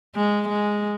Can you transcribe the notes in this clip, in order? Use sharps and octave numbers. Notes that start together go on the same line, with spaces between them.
G#3
G#3